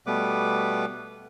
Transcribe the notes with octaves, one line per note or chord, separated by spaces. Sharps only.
B2 G3 A3 B3 B4 D6